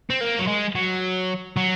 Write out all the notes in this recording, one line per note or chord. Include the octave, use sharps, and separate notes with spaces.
C4
A#3
F#3
G#3
F#3
F#3